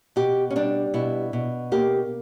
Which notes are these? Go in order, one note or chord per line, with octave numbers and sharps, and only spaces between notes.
B2 G4
C#4
G3 D4
B2 E4
B2
A#3 G4